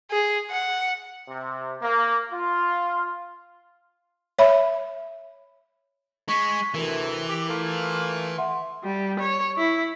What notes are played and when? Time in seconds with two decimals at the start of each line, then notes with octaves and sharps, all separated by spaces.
0.11 G#4
0.51 F#5
1.29 C3
1.82 A#3
2.32 F4
4.39 C#5 E5 B5
6.28 G#3 C#6 B6 C#7
6.74 D2 C3 E3 A#4
7.28 G4
7.48 A3 A#3 F4
7.68 F7
8.38 E5 F#5 C6
8.84 G3
9.20 C#5
9.58 E4